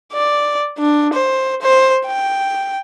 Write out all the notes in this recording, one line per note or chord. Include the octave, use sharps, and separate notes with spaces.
D5
D4
C5
C5
G5